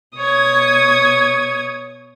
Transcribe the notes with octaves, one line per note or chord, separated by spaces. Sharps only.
B2 C#5 D#6 G#6